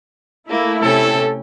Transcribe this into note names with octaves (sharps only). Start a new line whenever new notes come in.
A3 A#3 E4
C3 C#4 A4 G5